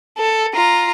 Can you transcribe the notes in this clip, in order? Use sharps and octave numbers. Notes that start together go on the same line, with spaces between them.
A4
F4 A#5